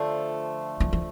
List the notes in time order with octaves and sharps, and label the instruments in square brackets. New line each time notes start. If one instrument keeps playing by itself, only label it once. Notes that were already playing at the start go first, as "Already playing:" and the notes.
Already playing: [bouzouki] D3 F3 A3
[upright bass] E3
E3